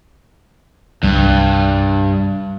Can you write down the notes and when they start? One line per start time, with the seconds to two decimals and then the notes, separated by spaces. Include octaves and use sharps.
1.03 C2 G2 G3